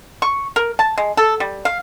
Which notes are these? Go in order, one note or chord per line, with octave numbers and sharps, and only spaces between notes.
C#6
A#4
A5
G#3
A4
G3
F5